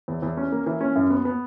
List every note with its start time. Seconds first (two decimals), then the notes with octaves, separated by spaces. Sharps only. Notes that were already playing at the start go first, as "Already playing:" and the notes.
0.08 E2
0.22 E2
0.37 C#4
0.52 A#3
0.66 E3
0.81 C#4
0.96 F#2
1.10 B3
1.25 B3